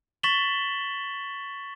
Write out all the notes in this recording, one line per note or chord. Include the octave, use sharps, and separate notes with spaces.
C#6 A6 B6 E7 F#7 G7